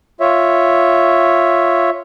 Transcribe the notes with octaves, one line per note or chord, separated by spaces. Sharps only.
F4 C#5 E5